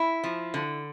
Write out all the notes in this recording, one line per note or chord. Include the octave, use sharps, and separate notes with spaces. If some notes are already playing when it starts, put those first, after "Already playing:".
Already playing: E4
F3
D3